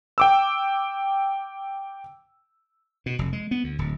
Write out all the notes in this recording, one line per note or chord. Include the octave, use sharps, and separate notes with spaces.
G5 D6 E6
B2
F1
G#3
B3
D2
D1